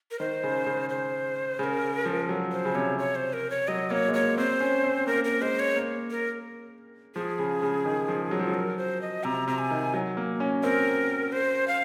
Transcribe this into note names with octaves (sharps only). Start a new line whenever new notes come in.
A#4
D#3 C5
C#3
C#3
C5
C#3 A#4 C5
F3
F#3
C5
C#3
C3 C#5
C#5
C5
A#4
C#5
F#3 D#5
A#3 C#5
G#3
A#3 C#5
C4 C5
C#4
C4
A#3 A#4
A#4
G#3 C5
C#5
A#3
A#4
F3 G#4
C#3
C#3
D#3
F3
F#3
F3
F#3
A#4
C5
D#5
C3 A#5
C3 A#5
G#5
D#3
F#3
A#3
C#4
C4 A#4
C5
F5